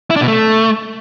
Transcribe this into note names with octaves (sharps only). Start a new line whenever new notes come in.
E4
D4
B2
A3